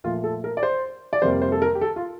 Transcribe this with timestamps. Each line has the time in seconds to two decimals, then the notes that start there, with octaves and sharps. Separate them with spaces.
0.04 A#2 F3 A3 F4
0.24 A4
0.44 A#4
0.57 D5
0.63 C5
1.13 D5
1.22 F2 C3 G3 A#3 C5
1.42 C5
1.52 A4
1.62 A#4
1.75 G4
1.81 A4
1.96 F4